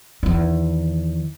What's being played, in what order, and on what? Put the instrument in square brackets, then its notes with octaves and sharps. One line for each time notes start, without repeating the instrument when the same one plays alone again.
[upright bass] E2 D#3